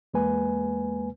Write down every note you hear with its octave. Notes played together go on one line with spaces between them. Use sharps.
E2 G#3 A#3 B4 G#5